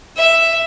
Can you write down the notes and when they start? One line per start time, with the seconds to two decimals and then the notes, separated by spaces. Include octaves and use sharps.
0.17 E5